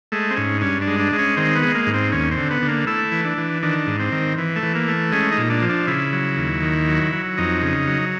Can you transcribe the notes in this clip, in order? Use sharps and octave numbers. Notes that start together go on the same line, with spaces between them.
G#3 A3
C4
G#2 C#4
G2 C#4
D4
G#3
D4
G#3
C#4
D#3 C4
B3
G#3
A#3
G#2
C4
D#2 C#4
C4
D3
B3
D3
A#3
A3 E4
E3
D4
E3
D#3 D4
G#2
C4
D#3
E3
A3
E3
A#3
A3
G#3 C#4
D#4
A#2
D4
F3
D4
C#3 E4
F#3
D#2
D#3
F#3
F#3
F2 D#4
C#3
F#3